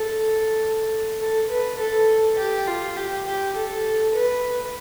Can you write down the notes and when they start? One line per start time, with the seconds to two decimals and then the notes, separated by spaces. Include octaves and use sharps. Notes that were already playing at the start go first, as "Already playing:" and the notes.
Already playing: A4
1.20 A4
1.50 B4
1.79 A4
2.38 G4
2.67 F4
2.96 G4
3.26 G4
3.55 A4
4.15 B4